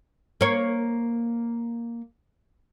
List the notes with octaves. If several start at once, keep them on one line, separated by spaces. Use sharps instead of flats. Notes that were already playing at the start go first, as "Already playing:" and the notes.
A#3 C#5